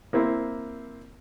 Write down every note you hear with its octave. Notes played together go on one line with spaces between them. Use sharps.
A#3 C4 E4